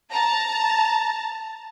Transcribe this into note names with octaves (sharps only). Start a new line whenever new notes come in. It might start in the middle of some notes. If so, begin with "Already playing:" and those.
A5 A#5